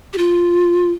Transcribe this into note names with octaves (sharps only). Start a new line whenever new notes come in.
G4
F4